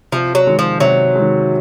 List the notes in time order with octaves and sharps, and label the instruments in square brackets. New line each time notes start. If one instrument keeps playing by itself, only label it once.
[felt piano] C3 [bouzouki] F3
[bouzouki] F#3
[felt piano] D#3 G#3
[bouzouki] F3
[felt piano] C3 [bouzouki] F#3
[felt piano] D#3 G#3